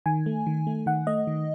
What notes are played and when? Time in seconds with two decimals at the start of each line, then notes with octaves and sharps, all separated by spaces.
0.06 D#3 G#5
0.26 A3
0.47 D#3
0.67 A3
0.86 D#3 F#5
1.07 A3 D#5
1.27 D#3